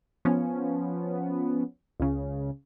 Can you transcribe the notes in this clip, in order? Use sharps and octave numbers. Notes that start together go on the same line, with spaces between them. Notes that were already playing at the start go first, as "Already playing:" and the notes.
F3 B3 C#4
C#2 C#3